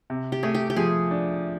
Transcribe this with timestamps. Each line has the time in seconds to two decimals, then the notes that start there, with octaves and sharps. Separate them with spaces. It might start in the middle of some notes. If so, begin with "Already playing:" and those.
0.10 C3
0.32 G4
0.43 A3 G#4
0.55 G4
0.70 G4
0.76 F3 G#4
1.11 D4